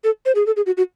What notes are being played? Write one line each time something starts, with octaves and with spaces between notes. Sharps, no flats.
A4
C5
G#4
A4
G#4
F#4
F#4